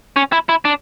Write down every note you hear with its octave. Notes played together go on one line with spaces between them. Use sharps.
C#4
E4
E4
D4